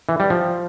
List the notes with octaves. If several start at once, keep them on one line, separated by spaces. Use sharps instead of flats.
E3
G3
F3